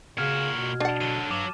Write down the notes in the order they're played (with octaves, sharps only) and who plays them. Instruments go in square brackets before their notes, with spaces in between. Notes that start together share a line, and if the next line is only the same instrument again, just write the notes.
[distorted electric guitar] A#2 F#4 [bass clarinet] C#3 [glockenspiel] F6 G#6
[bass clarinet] B2
[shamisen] D4 F#5 [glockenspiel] A5 A6
[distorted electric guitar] D3 F#3 [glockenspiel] D#7
[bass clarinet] G2 [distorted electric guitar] F#3 [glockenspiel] D6 E7